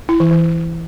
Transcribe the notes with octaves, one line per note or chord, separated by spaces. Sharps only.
E4
E3
E3